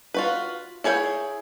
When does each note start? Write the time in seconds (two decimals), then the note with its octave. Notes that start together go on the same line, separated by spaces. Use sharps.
0.14 F4 F#4 B4
0.84 E4 G#4 C#5 F5 G5